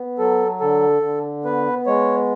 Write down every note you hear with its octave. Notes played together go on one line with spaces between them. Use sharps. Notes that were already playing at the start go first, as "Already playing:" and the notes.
Already playing: B3
F#3 A4
D3 A4
D3
B3 B4
G#3 C#5